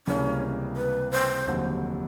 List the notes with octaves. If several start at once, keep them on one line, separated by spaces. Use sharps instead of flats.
C#2 C3 E3 G3 A#3 C#4
B4
C5
F1 D#2 D3 F#3